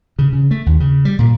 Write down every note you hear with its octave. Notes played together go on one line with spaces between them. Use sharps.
C#3
C#3
A3
D#2
C#3
G3
A#2